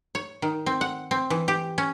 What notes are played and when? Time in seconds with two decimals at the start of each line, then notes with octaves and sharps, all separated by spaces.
0.15 C#5
0.42 D#3
0.66 C4
0.81 F#5
1.11 C4
1.30 E3
1.48 G4
1.78 C#4